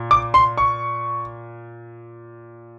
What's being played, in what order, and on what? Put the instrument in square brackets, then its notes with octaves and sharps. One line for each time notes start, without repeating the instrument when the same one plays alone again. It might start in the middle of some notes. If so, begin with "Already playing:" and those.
Already playing: [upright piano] A#2
[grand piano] D6
C6
C#6